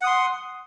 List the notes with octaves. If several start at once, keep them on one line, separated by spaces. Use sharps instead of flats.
F#5 C6 D#6